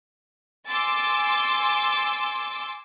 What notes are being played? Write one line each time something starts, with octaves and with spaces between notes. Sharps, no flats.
G#5 C6 D6 E6 A6